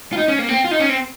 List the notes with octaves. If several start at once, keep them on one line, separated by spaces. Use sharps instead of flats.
F4
D#4
C#4
A#3
C4
F4
D#4
C#4
C4